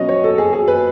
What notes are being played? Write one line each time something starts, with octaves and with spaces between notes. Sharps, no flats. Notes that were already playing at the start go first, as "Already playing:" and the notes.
Already playing: B2 F#3 C#4 D#5
C#5
A4
G#4
G#4
B4